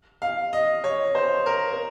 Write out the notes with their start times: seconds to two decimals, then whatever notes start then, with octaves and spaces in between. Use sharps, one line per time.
0.22 F5
0.53 D#5
0.84 C#5
1.15 C5
1.46 A#4
1.72 A#4